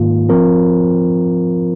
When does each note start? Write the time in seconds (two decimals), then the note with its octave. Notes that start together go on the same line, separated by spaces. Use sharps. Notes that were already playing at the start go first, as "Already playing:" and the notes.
Already playing: G#2 D#3 A#3 F4
0.29 F3 C4 F4 A#4